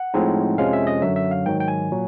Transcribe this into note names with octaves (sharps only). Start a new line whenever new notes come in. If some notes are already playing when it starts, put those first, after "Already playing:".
Already playing: F#5
A2 F3 G#3 C4 D#4
F2 C3 F3 G#3 C#4 F5
E5
D#5
F#2 D3 F#3 E5
E5
F5
G#2 D#3 F#3 G5
G5
G#5
A#2 F#3